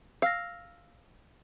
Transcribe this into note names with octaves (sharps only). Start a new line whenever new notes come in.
F5 E6 F6 A#6